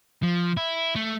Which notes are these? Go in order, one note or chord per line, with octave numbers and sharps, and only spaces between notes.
F3
E4
A3